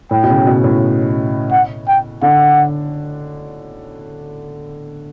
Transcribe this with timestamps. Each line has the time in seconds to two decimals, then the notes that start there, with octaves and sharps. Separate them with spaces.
0.11 A2 G5
0.24 B2
0.30 C#3
0.47 B2
0.64 A2
1.52 F#5
1.88 G5
2.22 D3 F#5